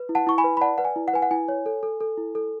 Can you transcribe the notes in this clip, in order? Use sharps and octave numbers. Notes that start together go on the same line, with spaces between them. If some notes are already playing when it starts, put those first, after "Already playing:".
Already playing: B4
E4
F#5 A5
E4 C#6
G#5 B5
B4
B5
D5 F#5 A5
B4 F#5
G#5
E4
F#5
B4 G#5
F#5
E4 G#5
C#5
A4
A4
A4
E4
A4